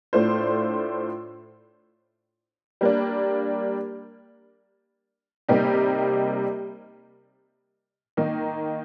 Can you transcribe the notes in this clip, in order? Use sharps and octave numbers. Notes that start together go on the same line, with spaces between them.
A2 A3 D4 F4 C5
G3 A#3 D4
C3 G3 A#3 D#4 G4
D#3 A#3 D#4